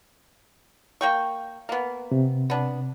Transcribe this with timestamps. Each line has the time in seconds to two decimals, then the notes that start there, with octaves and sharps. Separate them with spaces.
1.01 A#3 G5 C#6
1.69 A#3 B3
2.12 C3
2.50 B3 D4